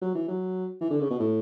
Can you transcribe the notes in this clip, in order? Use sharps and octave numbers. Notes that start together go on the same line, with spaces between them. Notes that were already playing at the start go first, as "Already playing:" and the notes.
F#3
E3
F#3
E3
D3
C#3
B2
A2